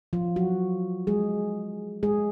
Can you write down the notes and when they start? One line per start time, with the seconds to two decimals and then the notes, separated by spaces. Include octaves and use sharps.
0.13 F3 F4
0.36 F#3 F#4
1.07 G#3 G#4
2.03 G#3 G#4